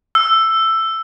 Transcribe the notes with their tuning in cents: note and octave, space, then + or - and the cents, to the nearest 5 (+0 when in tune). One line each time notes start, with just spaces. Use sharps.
E6 +10